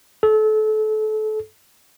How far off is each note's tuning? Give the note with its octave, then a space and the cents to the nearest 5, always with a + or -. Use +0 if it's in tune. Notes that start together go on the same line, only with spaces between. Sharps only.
A4 -30